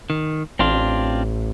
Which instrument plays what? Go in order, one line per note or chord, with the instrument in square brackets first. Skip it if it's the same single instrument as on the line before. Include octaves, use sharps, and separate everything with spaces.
[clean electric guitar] D#3
[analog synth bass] A1 [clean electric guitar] C4 D4 F4